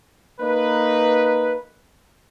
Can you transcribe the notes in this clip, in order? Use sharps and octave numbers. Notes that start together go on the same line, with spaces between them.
A#3 D#4 B4